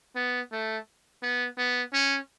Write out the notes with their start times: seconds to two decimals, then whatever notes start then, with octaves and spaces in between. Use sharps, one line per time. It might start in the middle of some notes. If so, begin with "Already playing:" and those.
0.16 B3
0.52 A3
1.22 B3
1.58 B3
1.93 C#4